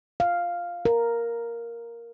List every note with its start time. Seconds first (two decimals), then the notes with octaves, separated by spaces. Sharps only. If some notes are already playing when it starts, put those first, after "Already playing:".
0.20 F5
0.85 A#4